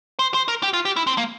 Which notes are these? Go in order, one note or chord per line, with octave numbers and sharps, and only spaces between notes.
C5
C5
A#4
G4
F4
G4
E4
C4
A#3